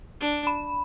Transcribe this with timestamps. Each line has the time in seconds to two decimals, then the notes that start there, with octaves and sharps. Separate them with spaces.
0.21 D4
0.47 B5